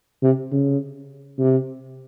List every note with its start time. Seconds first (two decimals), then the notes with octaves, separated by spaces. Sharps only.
0.23 C3
0.52 C#3
1.39 C3